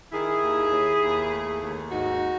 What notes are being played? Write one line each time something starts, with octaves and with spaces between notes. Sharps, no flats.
D#3 E4 G#4
D#2
D#2
D#2
A3
D#2
G#2 D#4 F#4